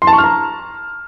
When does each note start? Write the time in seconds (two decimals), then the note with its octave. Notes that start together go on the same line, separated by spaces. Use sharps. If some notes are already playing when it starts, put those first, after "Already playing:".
0.02 C6
0.07 A5
0.13 C#6
0.18 F6
0.24 A#5